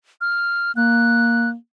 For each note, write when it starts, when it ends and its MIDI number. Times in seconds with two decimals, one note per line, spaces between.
0.21 0.72 89
0.76 1.55 58
0.76 1.49 90